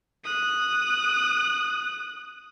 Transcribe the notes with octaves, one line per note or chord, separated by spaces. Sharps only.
D#6 F#6